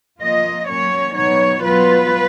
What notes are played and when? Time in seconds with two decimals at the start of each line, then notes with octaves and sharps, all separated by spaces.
0.21 F3 A#3 F4 D#5
0.68 F#3 A#3 C#4 C#5
1.16 B2 F#3 B3 D#4 C#5
1.63 F#3 B3 F4 B4